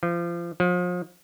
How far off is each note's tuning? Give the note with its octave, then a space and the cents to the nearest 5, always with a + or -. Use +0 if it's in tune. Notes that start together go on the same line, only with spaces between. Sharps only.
F3 -30
F3 +35